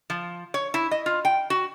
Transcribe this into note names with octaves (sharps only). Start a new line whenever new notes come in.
F3
C#5
E4
D#5
F4
G5
F#4